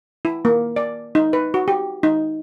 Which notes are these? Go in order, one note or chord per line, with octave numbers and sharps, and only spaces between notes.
E4
A#3
D5
D#4
B4
F#4
G4
D#4